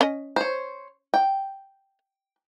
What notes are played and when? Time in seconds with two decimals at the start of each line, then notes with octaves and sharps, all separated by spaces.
0.01 C#4 D#5
0.36 C5 C#5
1.14 G5